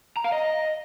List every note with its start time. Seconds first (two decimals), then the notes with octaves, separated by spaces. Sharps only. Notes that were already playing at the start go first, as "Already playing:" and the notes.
0.17 A#5
0.24 F5
0.32 D#5